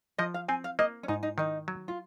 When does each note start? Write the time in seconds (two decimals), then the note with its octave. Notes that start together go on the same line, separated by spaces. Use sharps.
0.18 F3 D#5
0.34 F5
0.48 C4 G#5
0.64 F5
0.79 A#3 D#5
1.03 C#4
1.08 G#2 D#4
1.23 D#4
1.38 D#3 D#4
1.68 F#3
1.88 F4